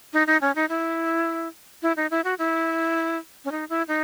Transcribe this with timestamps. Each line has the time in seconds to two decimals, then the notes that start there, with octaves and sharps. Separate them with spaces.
0.13 D#4
0.27 D#4
0.42 C#4
0.55 D#4
0.69 E4
1.82 E4
1.97 D#4
2.11 E4
2.24 F#4
2.39 E4
3.45 C#4
3.52 D#4
3.69 E4
3.88 D#4